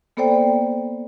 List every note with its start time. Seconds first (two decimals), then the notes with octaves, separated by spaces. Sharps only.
0.17 A#3 B3 A4 C5 D5 G5